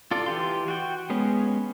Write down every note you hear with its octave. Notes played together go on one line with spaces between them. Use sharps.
F4 A4 D5
E3 G4 C6
F#4 G5
G#3 B3 C#4